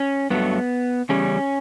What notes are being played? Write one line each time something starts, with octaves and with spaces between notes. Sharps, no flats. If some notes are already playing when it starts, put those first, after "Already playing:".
Already playing: C#4
G2 F#3 A3 B3
E2 C#3 G3 C#4